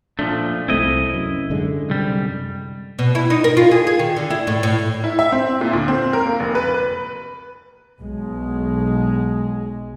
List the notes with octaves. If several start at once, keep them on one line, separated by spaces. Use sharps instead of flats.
A#2 F3 A3 D4
C2 A3 C4 E4 D#5
F#2
F#2 D3 G#3
C2 G3
B2
E4
D#4
A#4
F4
G#4
G#4
D#3
D3
E4
A2
A2
E4
E5
C4
A#2
D2
C4
A#4
A#3
F1
B4
B4
B1 G#3